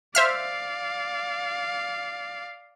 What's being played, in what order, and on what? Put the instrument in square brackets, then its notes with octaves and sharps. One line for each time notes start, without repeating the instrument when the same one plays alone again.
[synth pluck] C5 E5 F6 [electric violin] D5 F5